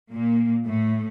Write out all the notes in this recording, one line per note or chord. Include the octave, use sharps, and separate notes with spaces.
A#2 A#3
A2 A3